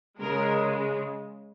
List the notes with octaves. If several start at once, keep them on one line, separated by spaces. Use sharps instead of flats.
C#3 G#3 A#4